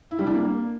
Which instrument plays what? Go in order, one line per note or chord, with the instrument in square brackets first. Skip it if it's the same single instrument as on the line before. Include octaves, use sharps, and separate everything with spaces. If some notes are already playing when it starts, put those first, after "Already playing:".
[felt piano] E4
G3
D4
A#3